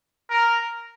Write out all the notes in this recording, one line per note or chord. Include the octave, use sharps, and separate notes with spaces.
A#4